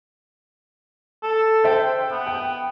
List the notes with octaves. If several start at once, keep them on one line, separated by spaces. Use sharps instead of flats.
A4
C5 E5 G5
B3
G5